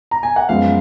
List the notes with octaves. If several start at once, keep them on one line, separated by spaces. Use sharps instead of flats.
A#5
G#5
F#5
F#2 F3 G#3 B3 F5